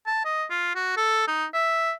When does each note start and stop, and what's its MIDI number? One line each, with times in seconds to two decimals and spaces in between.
0.07 0.22 81
0.25 0.45 75
0.51 0.71 65
0.75 0.96 66
0.97 1.27 69
1.28 1.45 63
1.54 1.92 76